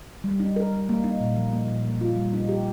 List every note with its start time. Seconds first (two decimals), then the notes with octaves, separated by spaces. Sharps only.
0.24 G3
0.40 D#4
0.56 A#4
0.73 G3
0.89 A#3
1.04 D#4
1.20 A#2
1.36 F3
1.53 A#3
1.68 A#2
1.84 A#3
2.01 F4
2.16 G3
2.33 D#4
2.49 G4